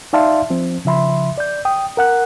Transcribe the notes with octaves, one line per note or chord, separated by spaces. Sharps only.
D#4 D5 E5 F5 A5 C6
F3 C4
C#3 F3 E5 B5 C6
D5 G6
G5 D#6
A#4 F#5 F#6